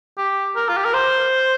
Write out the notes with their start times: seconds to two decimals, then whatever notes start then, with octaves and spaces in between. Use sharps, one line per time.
0.18 G4
0.56 A#4
0.69 F4
0.77 G4
0.85 A#4
0.94 C5